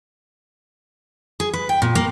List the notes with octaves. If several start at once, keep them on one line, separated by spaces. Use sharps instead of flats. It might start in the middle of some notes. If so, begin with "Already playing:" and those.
G#4
B4
G5
A#2
A#3